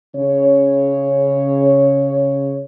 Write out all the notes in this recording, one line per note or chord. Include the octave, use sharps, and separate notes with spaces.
C#3 C#5